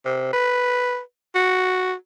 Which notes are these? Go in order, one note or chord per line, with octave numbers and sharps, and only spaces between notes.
C3
B4
F#4